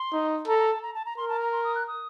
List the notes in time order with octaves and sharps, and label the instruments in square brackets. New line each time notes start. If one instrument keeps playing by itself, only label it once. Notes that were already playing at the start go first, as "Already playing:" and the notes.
Already playing: [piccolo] C6
[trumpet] D#4
[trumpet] A4 [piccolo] A#5
[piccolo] A#5
A5
A#5
A5
A#5
[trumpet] A#4 [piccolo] C6
[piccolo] A5
A#5
C6
D#6
F#6
D#6